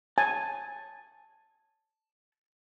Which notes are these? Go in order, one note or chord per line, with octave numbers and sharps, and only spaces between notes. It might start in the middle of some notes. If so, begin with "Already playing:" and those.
G#5 A5